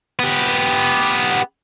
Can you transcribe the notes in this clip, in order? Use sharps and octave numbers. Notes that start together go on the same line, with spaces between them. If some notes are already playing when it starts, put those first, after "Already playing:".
B3 G4